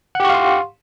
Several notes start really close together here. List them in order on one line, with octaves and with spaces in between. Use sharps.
F#5 G4 C#6 F5 C6